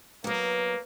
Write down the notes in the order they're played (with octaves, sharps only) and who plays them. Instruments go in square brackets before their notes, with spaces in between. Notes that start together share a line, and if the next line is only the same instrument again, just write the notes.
[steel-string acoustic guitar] F#3 B3 [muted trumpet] A#3